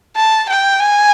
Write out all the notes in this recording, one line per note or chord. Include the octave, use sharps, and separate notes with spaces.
A5
G5
G#5